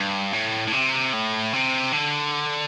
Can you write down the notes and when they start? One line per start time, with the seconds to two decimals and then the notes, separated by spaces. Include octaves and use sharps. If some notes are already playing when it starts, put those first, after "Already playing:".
Already playing: G2
0.33 A2
0.68 A2
0.73 C3
1.13 A2
1.53 C3
1.92 D3